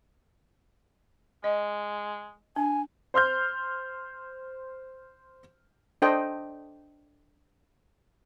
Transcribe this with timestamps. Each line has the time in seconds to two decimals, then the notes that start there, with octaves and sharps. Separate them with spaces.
1.44 G#3 D#5
2.56 D4 G#5
3.14 C5 C6 F6 G6
6.02 D4 A4 C5 D#5 G5